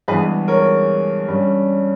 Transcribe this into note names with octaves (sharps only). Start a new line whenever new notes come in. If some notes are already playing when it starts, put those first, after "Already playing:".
G2 E3 G#3 B3 G#4 B4
A#4 C#5
G2 G3 C#4